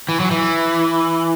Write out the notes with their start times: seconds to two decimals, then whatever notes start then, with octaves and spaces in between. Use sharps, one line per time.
0.09 E3
0.20 F#3
0.31 E3